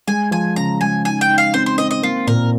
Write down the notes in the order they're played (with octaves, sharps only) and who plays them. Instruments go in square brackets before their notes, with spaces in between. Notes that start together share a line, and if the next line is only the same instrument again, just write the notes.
[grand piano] G#3 [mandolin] G#5
[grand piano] F3 [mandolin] G#5
[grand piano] C#3 [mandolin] A#5
[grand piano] G#3 [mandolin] G#5
[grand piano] D#4 [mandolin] G#5
[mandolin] G5
[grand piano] D#4
[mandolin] F5
[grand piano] C4 [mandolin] C5
[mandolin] C5
[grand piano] C4 [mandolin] D#5
[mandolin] D#5
[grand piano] A#3 [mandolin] F4
[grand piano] A#2 [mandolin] A#4